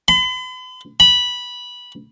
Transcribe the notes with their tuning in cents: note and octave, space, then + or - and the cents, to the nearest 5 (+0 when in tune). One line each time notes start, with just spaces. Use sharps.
B5 +45
B5 -10